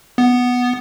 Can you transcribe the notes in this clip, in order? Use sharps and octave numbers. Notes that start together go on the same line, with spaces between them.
B3